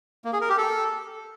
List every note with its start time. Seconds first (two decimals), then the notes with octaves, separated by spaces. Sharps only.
0.25 A#3
0.33 G#4
0.41 A#4
0.49 G4
0.58 A4